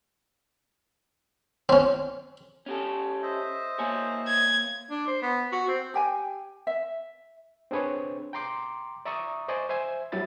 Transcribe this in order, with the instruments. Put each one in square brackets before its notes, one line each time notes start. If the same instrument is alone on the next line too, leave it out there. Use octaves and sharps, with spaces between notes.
[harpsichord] C4 C#4
[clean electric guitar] C#4 G4 A4
[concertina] C5 D#5 E5
[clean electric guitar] A#3 C#5 G#5
[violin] G#6
[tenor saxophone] D4
C5
B3
F#4
C4
[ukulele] G4 G5 G#5
E5
[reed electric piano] C4 D4 G#4 B4 C#5
G5 A#5 C6 D6
D5 E5 A#5 C#6 D#6
C5 D5 D#5 G#5 C#6
C5 E5 G#5
F#3 G3 E4 B5 A6